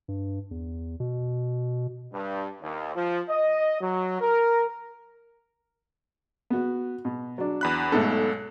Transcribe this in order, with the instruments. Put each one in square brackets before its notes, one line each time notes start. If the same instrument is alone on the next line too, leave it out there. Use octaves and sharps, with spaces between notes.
[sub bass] G2
E2
B2
[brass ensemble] G2
D#2
F3
D#5
F#3
A#4
[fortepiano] B3 F#4
B2
F#3 D4
[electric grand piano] E2 B5 F#6
[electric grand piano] B1 A4 [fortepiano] G#2 B2 A3